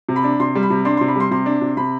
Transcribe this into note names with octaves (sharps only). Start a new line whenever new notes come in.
C3
B5
D4
C3 C6
G3
B5
C3
D4 C6
C3 C6
B5
G3 C6
C3 C6
D4
C3
C3 B5